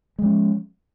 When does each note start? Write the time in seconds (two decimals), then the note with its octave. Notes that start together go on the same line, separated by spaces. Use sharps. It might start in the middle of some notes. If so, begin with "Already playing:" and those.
0.19 G#3
0.22 F3
0.25 C#4